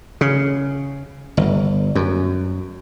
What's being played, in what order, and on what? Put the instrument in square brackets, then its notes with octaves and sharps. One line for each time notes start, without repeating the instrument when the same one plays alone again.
[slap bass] C#3
G1
F#2